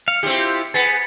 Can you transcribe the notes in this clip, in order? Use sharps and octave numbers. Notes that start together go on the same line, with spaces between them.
F5 C#7
C4 E4 F4 G4
B3 G#4 A6 B6 C#7